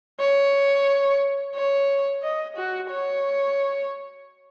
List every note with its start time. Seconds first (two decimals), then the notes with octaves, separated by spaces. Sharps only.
0.20 C#5
1.55 C#5
2.23 D#5
2.56 F#4
2.90 C#5